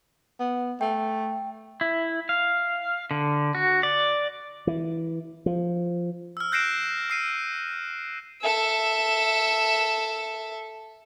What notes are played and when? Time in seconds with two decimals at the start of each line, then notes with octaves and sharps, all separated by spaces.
0.40 B3
0.81 A3 G5
1.81 E4
2.29 F5
3.11 D3
3.55 F#4
3.83 D5
4.67 E3
5.46 F3
6.37 E6 F6
6.52 F#6 G6 A#6 C7 D7 E7
7.10 E6 C7 D#7
8.42 A4 E5